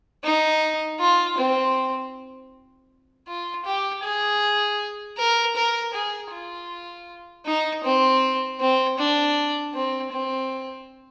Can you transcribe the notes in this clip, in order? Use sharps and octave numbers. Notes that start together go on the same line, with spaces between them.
D#4
F4
C4
F4
G4
G#4
A#4
A#4
G#4
F4
D#4
C4
C4
D4
C4
C4